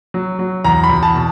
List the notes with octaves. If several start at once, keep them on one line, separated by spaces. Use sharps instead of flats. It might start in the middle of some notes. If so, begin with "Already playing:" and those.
F#3
F#3
E2 A#5
B5
E2
A5
B2